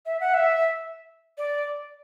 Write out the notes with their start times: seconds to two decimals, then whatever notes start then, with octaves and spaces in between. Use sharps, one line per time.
0.06 E5
0.20 F#5
0.34 E5
1.38 D5